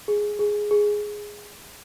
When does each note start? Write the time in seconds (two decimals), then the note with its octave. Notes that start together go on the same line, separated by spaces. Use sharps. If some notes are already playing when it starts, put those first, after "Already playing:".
0.08 G#4
0.39 G#4
0.71 G#4